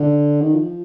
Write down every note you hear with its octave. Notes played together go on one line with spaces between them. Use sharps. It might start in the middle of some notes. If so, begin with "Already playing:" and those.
Already playing: D3
D#3
F3